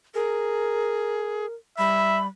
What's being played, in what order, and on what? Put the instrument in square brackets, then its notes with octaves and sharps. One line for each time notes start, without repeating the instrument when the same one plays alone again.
[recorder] G#4 [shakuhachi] A#4
[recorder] G3 [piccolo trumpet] E5 [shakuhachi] B5